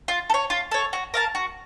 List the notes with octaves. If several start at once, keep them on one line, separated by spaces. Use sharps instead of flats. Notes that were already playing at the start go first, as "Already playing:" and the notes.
F4
A4
C#5
F4
A4 C#5
F#4
A#4 F5 A5
F#4